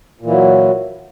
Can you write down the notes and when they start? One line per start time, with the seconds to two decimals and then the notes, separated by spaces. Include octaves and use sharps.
0.21 A#2
0.26 E3
0.30 F#3